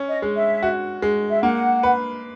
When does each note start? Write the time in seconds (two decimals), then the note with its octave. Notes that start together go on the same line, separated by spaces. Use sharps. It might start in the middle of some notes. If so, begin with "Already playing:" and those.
Already playing: C#4
0.09 D#5
0.22 G#3
0.36 E5
0.63 F#4
1.02 G#3
1.31 E5
1.42 A#3 F#5
1.83 B4